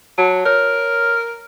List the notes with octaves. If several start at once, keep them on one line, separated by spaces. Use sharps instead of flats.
F#3 A5
A#4 C#5